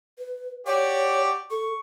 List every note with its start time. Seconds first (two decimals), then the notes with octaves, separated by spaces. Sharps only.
0.18 B4
0.67 F#4 G4 C#5 D5
1.51 A4 C#6